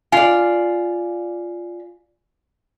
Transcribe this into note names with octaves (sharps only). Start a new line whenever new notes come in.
F4 D5 G#5